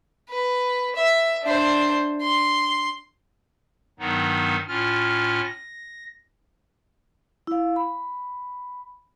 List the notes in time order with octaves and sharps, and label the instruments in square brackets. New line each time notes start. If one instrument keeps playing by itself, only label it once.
[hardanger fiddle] B4
E5
D4 C5
C6
[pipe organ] G2 D#3 F#3 B3 D#4
A2 C#4 F4 F6
A#6
[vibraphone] E4 F5
B5